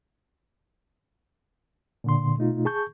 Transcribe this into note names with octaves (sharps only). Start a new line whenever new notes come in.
A#2 D3 C6
B2 A3 D#4 F4
G#4 A5 C#6 G6